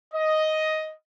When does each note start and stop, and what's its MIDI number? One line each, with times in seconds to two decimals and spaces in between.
0.14 0.92 75